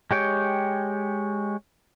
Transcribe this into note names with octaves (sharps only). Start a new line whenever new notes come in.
G#3 G4 C#5 G5